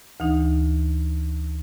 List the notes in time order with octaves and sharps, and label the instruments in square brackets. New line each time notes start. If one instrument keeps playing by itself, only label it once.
[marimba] D2 E3 D#4